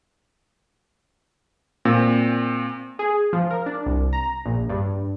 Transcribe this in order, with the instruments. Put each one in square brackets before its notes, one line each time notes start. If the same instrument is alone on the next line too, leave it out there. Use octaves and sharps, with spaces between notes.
[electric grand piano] A#2 C4
[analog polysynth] G#4
F3
A#4
D4
C2
A#5
A#1
G2